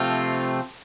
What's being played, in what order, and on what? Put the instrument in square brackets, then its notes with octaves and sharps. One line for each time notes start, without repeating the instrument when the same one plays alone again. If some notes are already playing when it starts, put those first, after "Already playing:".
Already playing: [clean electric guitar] C3 F3 A3 C4 F4